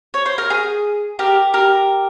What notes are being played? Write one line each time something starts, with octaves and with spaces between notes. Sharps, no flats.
C#5
C5
A#4
G#4
G4 A#4
G4 A#4